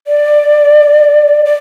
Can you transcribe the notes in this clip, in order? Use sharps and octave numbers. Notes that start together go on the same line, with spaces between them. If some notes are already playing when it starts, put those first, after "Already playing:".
D5
D5